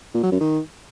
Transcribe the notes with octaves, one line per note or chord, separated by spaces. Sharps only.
A#2
F#3
F#2
D#3